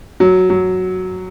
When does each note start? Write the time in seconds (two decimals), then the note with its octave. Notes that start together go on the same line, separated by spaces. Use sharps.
0.20 F#3
0.50 F#3